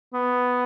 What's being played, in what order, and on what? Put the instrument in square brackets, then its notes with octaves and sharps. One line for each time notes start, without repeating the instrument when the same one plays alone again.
[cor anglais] B3